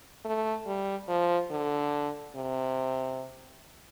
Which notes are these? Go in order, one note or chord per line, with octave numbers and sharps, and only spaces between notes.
A3
G3
F3
D3
C3